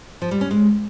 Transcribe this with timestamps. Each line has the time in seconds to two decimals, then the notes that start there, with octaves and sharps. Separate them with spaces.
0.22 F3
0.31 G3
0.41 C#4
0.51 G#3